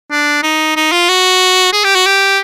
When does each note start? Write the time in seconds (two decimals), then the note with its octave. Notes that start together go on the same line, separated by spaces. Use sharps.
0.11 D4
0.43 D#4
0.76 D#4
0.92 F4
1.09 F#4
1.73 G#4
1.84 G4
1.95 F#4
2.06 G4